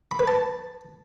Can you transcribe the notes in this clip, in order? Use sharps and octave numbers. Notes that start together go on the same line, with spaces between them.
B5
B4
A5